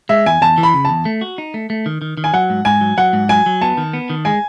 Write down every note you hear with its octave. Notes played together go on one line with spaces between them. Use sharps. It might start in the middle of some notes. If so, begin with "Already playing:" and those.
G#3 E5
E2 G#5
E2 A5
E3
B5
C#3
E2 A5
A3
F#4
D#4
A3
A3
D#3
D#3
D#3
G#5
F#3 F#5
G#2
G#2 G#5
F#3
F#3 F#5
G#2
F#3 G#5
F#3
B3 A5
D#3
B3
D#3
G#3 G#5